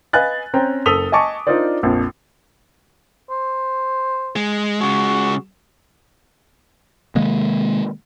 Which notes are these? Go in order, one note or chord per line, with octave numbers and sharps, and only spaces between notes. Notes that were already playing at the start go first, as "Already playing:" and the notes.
B4 D#5 F5 G#5 F#6 A6
C4 C#4 C5 G5 A#5
F#1 A4 D#6 B6 F7 G7
D#5 G#5 A5 C#6 D6
D4 D#4 F4 A#4 C5 D5
A#1 F2
C5
G#3
C#3 G#3 F#4
C3 D#3 G#3 A#3